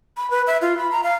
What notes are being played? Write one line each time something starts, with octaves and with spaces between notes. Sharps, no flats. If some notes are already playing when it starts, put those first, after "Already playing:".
B5
B4
E5
F4
B5
A#5
F5